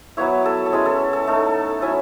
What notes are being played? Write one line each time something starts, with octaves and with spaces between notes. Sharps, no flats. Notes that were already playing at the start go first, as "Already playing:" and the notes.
F#3 B3 E4 C#5
A4
A4
G#3 C#4 E4 G#4
A4
A4
A3 D#4 A4
F#3 C#4 E4 G#5